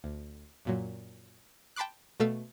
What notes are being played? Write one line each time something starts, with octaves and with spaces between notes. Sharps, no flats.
D2
F#2 A#2 F#3
G5 A5 B5 C6 D6 F#6
B2 A3 A4 F5 E6